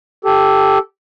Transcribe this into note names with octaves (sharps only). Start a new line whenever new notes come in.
G4 A4